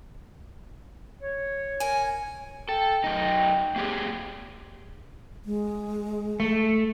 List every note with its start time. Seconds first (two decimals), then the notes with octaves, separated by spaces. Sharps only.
1.21 C#5
1.80 A#4 G#5
2.69 A4 G5
3.04 F#2 D#4
3.76 A#3 G4 G#4
5.45 G#3
6.40 A3